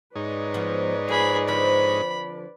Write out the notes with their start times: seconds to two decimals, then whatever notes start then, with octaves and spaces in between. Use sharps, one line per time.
0.15 G#2 D#4 B4 C#5 D5
0.54 F3 B3
1.09 F3 G#4 B5
1.48 D3 F3 C4 B5